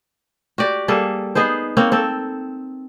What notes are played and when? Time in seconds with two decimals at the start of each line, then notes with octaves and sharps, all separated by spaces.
0.58 F#4 G4 D5
0.88 G3 A#3 G#4 A4
1.35 B3 D#4 G#4 C5
1.77 A#3 C4 C#5
1.92 C4 A4